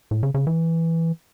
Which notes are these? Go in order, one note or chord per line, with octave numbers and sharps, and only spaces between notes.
A2
C#3
C#3
E3